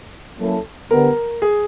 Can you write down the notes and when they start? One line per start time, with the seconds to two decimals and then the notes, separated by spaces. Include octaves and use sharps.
0.40 F#3 A#3 C#4 E4 A4
0.91 D3 G3 B3 A#4
1.42 G#4